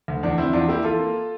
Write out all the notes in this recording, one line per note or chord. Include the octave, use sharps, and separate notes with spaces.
D2
E2 D4
E3 C4 E4
E2 D4 F4
A#3 E4 G4
E3 F4 A4
A#3